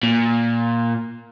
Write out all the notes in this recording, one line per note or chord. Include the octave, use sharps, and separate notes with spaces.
A#2